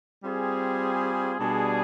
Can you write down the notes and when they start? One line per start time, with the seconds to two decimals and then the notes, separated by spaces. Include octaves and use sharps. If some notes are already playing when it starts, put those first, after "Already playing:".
0.23 G3 C4 F4 G#4
1.38 B2 G3 D4 G#4